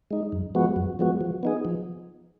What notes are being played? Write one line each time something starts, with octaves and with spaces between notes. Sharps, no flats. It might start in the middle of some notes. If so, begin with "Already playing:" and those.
G#3 D#4
F#2
F3 G#3 B3 F#4
F#2
F3 G#3 B3 F#4
F3
B3 D#4 G#4
F3